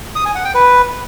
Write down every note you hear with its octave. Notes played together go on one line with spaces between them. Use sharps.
D#6
G#5
F#5
G5
B4